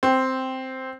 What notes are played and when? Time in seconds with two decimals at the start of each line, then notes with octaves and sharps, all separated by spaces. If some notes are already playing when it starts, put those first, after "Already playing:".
0.03 C4